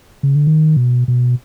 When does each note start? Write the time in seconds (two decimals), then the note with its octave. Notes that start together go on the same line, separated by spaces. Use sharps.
0.23 C#3
0.35 D3
0.47 D#3
0.77 B2
1.08 B2